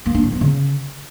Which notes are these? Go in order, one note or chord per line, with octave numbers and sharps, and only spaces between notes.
A#3
D4
A2
B3
C#3